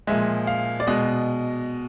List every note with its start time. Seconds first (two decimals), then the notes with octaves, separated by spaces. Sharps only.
0.07 A#2 F3 G#3 E5
0.47 F5
0.80 D5
0.87 B2 G#3 D#5